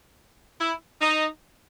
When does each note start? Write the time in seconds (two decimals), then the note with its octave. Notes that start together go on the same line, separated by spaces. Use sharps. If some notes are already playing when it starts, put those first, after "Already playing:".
0.61 E4
1.01 D#4